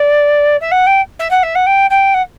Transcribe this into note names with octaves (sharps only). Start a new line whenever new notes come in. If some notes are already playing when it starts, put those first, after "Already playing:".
Already playing: D5
E5
F#5
G5
E5
F#5
E5
F#5
G5
G5
F#5